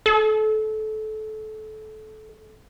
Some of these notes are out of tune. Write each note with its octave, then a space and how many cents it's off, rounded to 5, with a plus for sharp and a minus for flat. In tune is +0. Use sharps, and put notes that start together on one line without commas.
A4 -25